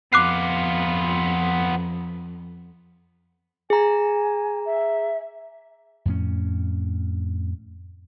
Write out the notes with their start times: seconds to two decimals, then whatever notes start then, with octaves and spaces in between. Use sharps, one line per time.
0.13 F2 B3 F4 D6 F#6 C7
3.70 G#4 G#5 A#5
4.66 E5
6.05 F2 A2 C#4